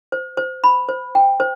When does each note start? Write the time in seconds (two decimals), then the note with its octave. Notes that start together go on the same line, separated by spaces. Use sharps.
0.12 C5
0.37 C5
0.64 B5
0.89 C5
1.15 G5
1.40 C5